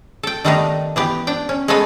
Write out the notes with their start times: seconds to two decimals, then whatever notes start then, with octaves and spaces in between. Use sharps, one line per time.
0.23 A4 G5
0.45 D#3 G3 A3 B3 D4 D#4
0.96 E3 B3 G4
1.27 D4 G5
1.49 C#4
1.68 G#3 A3 B3 A4 C#5 G#5